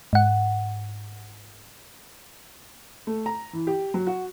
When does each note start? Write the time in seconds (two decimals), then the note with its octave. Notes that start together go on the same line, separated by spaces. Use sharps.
0.13 G#2 F#5
3.07 A3
3.26 A#5
3.53 E3
3.67 G4
3.94 F#3
4.07 F#4